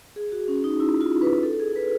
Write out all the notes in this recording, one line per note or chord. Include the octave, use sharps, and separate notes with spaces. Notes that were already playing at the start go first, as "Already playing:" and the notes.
G#4
F#4
C#4
D#4
E4
F4
B4
A4
G#4
B4